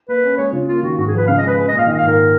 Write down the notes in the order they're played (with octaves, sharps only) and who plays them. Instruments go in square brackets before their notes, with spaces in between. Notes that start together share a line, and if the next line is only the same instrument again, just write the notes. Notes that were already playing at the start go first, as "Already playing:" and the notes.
[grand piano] A#3 [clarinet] B4
[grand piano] C#4
[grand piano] G#3 [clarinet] C#5
[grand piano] C#3 [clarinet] F4
[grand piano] A#3 [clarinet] F4
[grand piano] D#3 [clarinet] F#4
[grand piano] G#2 [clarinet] F#4
[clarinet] G#4
[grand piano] F3 [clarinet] B4
[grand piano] C#3 [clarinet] F5
[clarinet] D#5
[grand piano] G#3
[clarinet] B4
[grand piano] G#3 [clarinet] B4
[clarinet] D#5
[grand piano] A#2
[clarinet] F5
[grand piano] D#3 [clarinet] D#5
[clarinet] F5
[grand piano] G#2 [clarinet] A#4